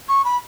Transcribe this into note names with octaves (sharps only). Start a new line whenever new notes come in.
C#6
B5